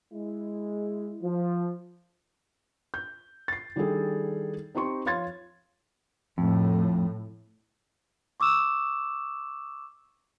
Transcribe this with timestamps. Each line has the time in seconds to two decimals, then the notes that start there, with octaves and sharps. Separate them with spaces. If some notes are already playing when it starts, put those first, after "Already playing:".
0.14 G#3 E4
1.23 F3
2.94 G6
3.48 A6 C7
3.76 D#3 G3 D4 E4 G#4 A4
4.75 C4 D#4 G4 C6 C#6
5.05 F3 C#5 F5 C6 G#6 A6
6.38 F2 A2
8.40 C#6 D6 E6 E7